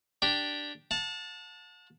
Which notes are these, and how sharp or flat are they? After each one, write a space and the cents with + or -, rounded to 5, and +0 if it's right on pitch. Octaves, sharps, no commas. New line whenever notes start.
D4 +0 G4 -5
F#5 -45 A5 +0